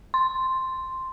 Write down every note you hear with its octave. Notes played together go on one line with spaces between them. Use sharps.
C6